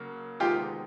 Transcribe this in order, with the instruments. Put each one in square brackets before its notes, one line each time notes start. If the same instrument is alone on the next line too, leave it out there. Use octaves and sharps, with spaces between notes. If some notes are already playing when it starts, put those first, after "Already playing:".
Already playing: [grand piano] C#3 F#3 A#3
[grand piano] D2 C3 D#3 G#3 B3 [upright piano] F4 G4